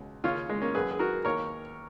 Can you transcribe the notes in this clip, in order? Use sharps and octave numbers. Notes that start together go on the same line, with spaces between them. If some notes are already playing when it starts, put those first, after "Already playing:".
Already playing: C#2 B2
D#2 C#3 C#4 F4
G#3
A#3 C#4
F#2 D#3 G#4 B4
G#4
F#4 A#4
D#2 D#3 A#4 C#5